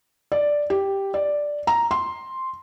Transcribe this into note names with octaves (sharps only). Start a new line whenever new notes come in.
D5
G4
D5
A#5
C6